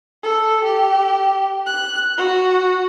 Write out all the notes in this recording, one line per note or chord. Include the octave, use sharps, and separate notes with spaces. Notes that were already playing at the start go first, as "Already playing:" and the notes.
A4
G4
F#6
F#4